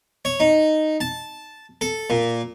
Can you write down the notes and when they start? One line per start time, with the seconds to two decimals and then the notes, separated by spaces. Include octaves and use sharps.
0.25 C#5
0.40 D#4
1.01 A5
1.81 A4
2.10 A#2